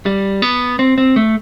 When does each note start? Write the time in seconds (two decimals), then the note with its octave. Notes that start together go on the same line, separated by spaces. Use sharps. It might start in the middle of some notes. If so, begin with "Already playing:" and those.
0.06 G3
0.42 B3
0.79 C4
0.98 C4
1.16 A3